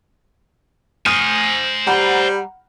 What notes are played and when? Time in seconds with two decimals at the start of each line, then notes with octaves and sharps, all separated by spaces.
1.06 C5 G#5 D#6 F6 G6
1.87 G3 F#5 A#5 B5